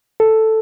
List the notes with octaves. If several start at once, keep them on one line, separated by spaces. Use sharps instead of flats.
A4